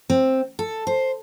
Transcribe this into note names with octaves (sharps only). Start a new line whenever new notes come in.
C4
A4
C5